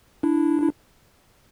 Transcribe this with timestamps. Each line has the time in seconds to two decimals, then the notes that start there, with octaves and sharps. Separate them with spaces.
0.23 D4 E4
0.62 E4